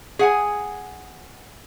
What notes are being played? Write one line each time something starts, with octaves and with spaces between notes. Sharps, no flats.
G#4 F#5 G#5